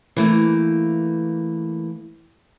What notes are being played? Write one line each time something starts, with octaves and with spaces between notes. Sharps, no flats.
E3 A3 A#3